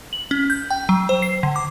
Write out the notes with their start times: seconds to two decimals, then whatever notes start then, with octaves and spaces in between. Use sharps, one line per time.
0.13 F#7
0.31 C#4
0.50 G6
0.71 G5
0.89 F#3
1.09 C5
1.22 C7
1.43 D3
1.56 D6